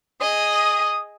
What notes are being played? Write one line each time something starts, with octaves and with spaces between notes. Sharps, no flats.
G#4 D#5 D#6